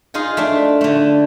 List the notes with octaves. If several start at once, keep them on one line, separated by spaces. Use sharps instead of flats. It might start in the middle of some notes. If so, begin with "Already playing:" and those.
D#4 F4 G#4 G#5
A3 D4
D3 A3